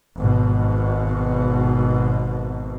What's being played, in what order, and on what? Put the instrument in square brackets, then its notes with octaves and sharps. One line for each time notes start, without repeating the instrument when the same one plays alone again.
[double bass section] G#1 B2